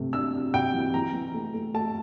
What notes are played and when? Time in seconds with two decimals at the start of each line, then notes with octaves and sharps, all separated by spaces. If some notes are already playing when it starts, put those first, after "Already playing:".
Already playing: C3 A3
0.13 D4 E6
0.34 D4
0.54 C3 G5
0.74 E3
0.94 E3 A#5
1.14 E3
1.34 A3
1.54 A3
1.74 A3 A5